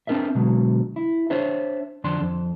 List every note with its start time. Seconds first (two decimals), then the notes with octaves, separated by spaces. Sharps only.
0.07 C4 D4 A#4 D#5 E5
0.35 B2 D3 F#3 G#3
0.96 E4
1.30 D4 C5 C#5 E5
2.04 F2 D3 D4 C6
2.21 F2